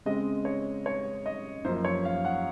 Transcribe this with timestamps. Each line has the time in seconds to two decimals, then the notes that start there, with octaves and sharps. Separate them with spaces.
0.05 C#3 G#3 C4 D#5
0.45 C#5
0.86 C#5
1.26 D#5
1.65 F#2 F3 A#3 C5
1.85 C#5
2.05 F5
2.25 F#5